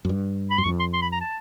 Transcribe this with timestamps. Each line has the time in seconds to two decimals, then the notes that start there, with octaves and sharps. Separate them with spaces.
0.05 F#2
0.09 G2
0.51 B5
0.58 F#2 C6
0.64 F2 C#6
0.80 C6
0.94 C6
1.02 B5
1.13 A#5
1.21 A5